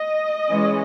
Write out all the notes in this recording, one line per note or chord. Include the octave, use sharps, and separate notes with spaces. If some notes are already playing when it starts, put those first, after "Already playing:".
Already playing: D#5
E3 G#3 C#4